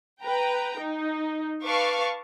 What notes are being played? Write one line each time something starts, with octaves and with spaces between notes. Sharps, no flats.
B4 G5 A#5
D#4
B4 F5 A5 C#6 D6